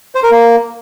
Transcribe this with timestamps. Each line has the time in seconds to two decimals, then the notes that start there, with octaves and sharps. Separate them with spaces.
0.15 C5
0.23 A#4
0.31 A#3